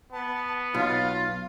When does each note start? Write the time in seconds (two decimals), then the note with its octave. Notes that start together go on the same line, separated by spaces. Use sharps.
0.12 B3 A5
0.75 B1 F4 F5